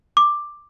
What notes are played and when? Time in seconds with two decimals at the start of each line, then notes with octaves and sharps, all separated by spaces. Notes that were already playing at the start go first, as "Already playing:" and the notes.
0.17 D6